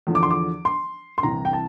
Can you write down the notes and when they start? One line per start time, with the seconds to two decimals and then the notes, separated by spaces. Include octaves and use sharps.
0.07 E2 D3 F3
0.15 D6
0.23 C6
0.30 D6
0.65 C6
1.18 C6
1.23 C2 C3 E3 A#5
1.45 G5
1.53 A5